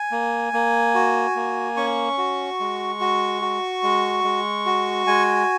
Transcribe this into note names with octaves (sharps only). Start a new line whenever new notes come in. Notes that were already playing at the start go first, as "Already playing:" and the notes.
Already playing: G#5
A#3
A#3
F#4
A#3
C#4 C#6
F#4
G#3
F#4
F#4
G#3
G#3
F#4
G#3 G#5